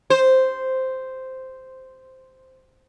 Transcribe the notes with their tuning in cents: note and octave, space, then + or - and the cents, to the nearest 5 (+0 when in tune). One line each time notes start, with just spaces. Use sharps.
C5 -5